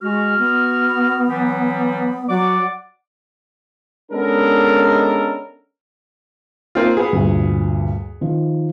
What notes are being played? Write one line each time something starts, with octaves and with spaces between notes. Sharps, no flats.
G#3 F#4 F6
B3
E3 F#3 G3
F#3 D5 F#5 D6
G#3 B3 C#4 D4 A4 A#4
A#3 C4 F4
B3 F#4 G#4 B4
D2 G2 A#2
D#3 F3